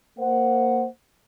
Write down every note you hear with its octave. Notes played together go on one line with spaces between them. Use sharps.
A#3 C5 F#5